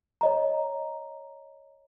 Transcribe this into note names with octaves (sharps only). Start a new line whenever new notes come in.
C#5 D#5 A#5